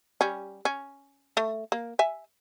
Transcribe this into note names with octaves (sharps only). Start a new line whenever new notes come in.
G3 C#4
C#4
A3
A#3
E5 G#5